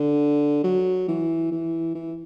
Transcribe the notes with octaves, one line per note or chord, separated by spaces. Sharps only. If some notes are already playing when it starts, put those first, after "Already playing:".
Already playing: D3
F#3
E3
E3
E3